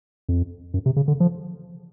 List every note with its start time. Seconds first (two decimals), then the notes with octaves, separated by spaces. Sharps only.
0.29 F2
0.74 F#2
0.86 C3
0.96 C#3
1.08 D3
1.20 F3